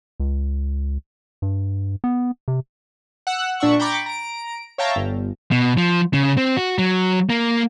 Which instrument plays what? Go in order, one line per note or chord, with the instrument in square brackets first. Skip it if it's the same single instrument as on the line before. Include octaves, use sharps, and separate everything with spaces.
[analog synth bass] C#2
G2
B3
C3
[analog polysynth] F#5 E6 F#6
A#2 D4 E5 F#5 C#6
G5 A#5 B5 C#6 D6 A6
A#5 D7
C#5 E5 F5 G5 A5 A#5
G1
[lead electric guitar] B2
F3
C#3
C4
F#4
F#3
A#3